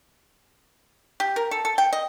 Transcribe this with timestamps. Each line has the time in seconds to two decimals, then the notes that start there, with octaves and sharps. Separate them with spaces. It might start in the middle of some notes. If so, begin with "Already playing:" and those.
1.20 G4
1.36 A#4
1.51 A4
1.65 A4
1.78 G5
1.93 D#5